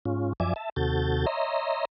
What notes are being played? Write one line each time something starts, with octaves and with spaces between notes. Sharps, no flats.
G#2 C#4 F4
F#2 F3 D5 E5 G#5 D6
E5 A5
D#2 C3 F#4 A4 G6 A6
C#5 D#5 E5 A#5 C6